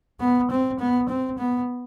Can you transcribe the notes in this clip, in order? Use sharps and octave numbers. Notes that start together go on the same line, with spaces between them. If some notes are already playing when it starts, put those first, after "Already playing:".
B3
C4
B3
C4
B3